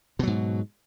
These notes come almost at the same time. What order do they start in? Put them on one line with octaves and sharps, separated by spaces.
B2 F#3 G#2